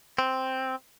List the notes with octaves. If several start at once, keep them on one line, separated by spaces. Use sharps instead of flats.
C4